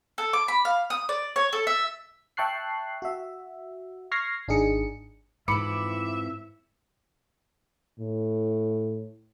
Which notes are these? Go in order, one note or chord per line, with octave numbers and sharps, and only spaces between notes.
A4
D6
B5
F5
D#6
D5
C#5
A4
E5
E5 G5 A5 C#6 F#6 C7
F#4 E5
C#6 F6 G#6 A#6 C7
G#1 D4 D#4 G#4 C#7
F2 G#2 E3 E5 B5 D6 C#7
A2